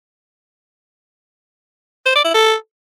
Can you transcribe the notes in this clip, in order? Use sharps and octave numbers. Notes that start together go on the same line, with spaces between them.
C5
D5
E4
A4